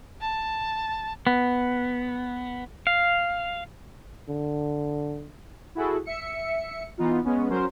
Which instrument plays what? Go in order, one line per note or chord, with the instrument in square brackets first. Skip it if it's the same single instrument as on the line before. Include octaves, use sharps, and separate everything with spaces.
[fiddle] A5
[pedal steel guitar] B3
F5
[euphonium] D3
[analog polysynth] E4 F#4 G#4 A4
E5 C#7
E3 B3 D#4 F4
G#3 B3 C#4
F#3 C#4 F#4 A#4 C5